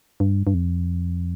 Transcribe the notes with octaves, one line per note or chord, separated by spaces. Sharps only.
G2
G2
F2